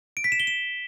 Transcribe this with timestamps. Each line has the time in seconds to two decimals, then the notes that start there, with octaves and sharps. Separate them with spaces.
0.17 D7
0.24 B6
0.32 E7
0.40 G7
0.47 E7